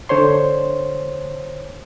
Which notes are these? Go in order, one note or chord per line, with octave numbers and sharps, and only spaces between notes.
D3 C5 C#5 C6